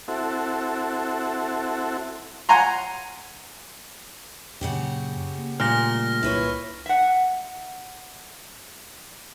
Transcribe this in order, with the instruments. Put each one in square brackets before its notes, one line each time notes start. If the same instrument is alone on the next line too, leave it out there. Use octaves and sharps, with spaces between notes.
[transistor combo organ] C4 E4 F#4 A4
[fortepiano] F#5 G#5 A#5 C6
[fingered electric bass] F#2 A#2 [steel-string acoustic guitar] C#3 F#4 G4
[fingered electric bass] A#3
[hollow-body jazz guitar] A#2 [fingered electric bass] G3 A3 D4 [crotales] F6 A#6
[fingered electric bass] C2 [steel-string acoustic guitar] E4 B4 C#5
[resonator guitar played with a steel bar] E5 F#5